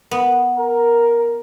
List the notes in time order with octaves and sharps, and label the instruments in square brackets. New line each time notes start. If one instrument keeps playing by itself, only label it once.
[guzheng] B3
[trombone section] A#4